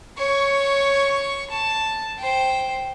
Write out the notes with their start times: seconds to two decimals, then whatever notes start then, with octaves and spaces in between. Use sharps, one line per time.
0.18 C#5 C#6
1.50 A5
2.18 C5 G5